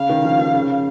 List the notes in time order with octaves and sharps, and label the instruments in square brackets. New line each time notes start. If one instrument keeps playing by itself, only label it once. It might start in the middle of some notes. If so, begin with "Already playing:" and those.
Already playing: [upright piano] C#3 [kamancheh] F5
[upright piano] D#3
F2 F3
D#3
C#3